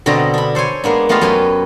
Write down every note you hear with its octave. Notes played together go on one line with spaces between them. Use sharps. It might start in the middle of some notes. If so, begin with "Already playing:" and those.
B2 D3 C4 D5 D#5 A#5
D4 B5
A4 C5 C#5 G#5
G#3 A#3 B3 D4
A3 B3 F4 G4 D#5 F5
F#2 C#4 G4 B4 G#5